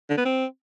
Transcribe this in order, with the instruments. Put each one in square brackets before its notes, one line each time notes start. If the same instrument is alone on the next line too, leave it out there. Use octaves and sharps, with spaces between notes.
[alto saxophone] D3
B3
C4